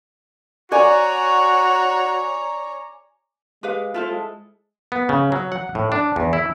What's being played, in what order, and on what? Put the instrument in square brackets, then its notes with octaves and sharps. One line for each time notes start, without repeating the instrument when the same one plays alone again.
[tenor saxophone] F#4 [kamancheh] C#5 A#5 [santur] D5 G#5
[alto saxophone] G#3 [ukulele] G4 B4 F5
[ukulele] E4 A4 C5 [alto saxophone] F4
[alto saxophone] G#3
[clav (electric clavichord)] B3
C#3
F#3
F#5
A2
D4
E2
E4